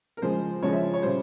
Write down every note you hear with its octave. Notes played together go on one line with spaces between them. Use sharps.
A#4
C#3 F3 G#3 C5
C#3 F3 G#3 C#5
E5
C#5
C#3 G3 C5